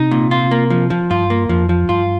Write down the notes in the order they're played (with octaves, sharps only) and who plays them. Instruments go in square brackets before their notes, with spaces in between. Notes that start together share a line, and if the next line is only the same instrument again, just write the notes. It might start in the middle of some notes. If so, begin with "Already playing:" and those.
Already playing: [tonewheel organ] C3 [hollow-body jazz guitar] D#4
[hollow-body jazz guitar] A#2
F4
A#3
F3
F3
[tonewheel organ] G2 [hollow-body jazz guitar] F4
[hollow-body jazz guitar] A#3
[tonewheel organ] F2 [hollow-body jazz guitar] F3
[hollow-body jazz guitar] F3
[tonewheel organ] G2 [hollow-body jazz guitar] F4